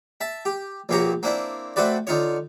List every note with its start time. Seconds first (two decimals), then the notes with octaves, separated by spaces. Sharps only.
0.21 E5 A5
0.45 G4
0.89 A#1 B2 A#3 G4 C#5 A#5
1.23 A#3 C4 D4 E4
1.76 A3 C4 F#4 B4 D5
2.07 D3 D#4 F4 C#5